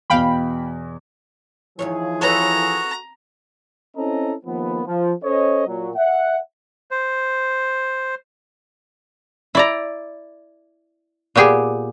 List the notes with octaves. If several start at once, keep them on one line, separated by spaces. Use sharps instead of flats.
E2 B2 F5 G5 B5
D#2 B2 E3 F3 G#4 C#5
F#4 A4 B4 C#5 A#5
C4 C#4 E4 A4 D#5 A#5
D#2 F3 A#3 B3
F3
C#4 A4 C5 C#5 D#5
A#2 F#3
E5 F#5
C5
E4 D5 A#5
A#2 B3 G4 G#4